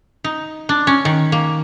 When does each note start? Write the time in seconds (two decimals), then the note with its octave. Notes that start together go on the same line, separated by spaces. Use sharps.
0.24 D#4
0.69 D4
0.87 C#4
1.05 D#3
1.32 A#3